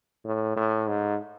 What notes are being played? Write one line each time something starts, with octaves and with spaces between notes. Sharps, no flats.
A2
A2
G#2